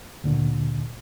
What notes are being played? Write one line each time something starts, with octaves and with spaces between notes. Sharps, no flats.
D2 A#2 D3